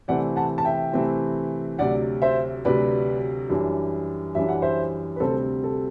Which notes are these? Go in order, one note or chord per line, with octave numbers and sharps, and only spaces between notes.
C3 E3 A3 C4 D5 F#5
F#5 A5
A5
E5 G5
C3 E3 A3 C4
D2 C3 F#3 D5 F#5
C5 E5
D2 C3 F#3 B4 D5
F#2 E3 G3 D4
F#2 E3 G3 D4 E5
F#5
C5 E5
B4
D2 C3 G3 C4 A4 C5
A4